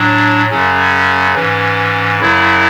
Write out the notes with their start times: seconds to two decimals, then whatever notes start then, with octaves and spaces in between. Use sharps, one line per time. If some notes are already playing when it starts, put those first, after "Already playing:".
Already playing: A2 F#3 D4
0.50 F#2 C#3 F#3 C#4
1.35 G#2 E3 C#4
2.20 F#2 C#3 F#3 E4